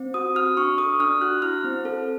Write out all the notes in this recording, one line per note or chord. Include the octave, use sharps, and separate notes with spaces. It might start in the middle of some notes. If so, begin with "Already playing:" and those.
Already playing: C4
F#4 D#6
F#4 F6
D4 C#6
A4 D#6
D4 F6
F#4 F#6
E4 F6
C4
A4